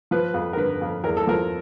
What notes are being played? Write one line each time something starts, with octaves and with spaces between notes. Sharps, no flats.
F3 B4
F2
A#4
D3 B4
F2
E2 A#4
A4
F3 A#4